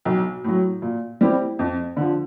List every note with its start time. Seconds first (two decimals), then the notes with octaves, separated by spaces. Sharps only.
0.05 B1
0.44 A2 F#3
0.82 A#2
1.21 G3 C4 E4 G4
1.59 F2
1.97 D3 F3